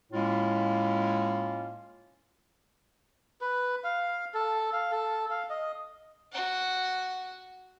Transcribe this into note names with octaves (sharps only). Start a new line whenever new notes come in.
A2 G#3 A#3 C#4 E4 F4
B4
F5
A4
F5
A4
F5
D#5
F#4 F#5